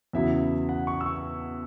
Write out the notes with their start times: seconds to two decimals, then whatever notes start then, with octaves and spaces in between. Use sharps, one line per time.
0.13 E2 C#3 F#3 E4 E5
0.69 F#5
0.87 C#6
1.01 E6
1.06 C#6